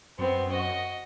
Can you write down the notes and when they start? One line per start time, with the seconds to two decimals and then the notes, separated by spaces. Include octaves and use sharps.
0.19 F#2 B3 C4
0.51 F#4 D#5